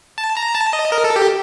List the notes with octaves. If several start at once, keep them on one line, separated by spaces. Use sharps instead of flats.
A5
A#5
A5
D#5
A#4
A4
G4